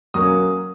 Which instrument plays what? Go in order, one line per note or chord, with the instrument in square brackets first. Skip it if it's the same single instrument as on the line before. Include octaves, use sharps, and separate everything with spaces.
[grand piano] F#3 A#3 C#4 D#6